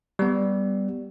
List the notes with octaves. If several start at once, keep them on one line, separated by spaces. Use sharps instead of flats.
G3 B3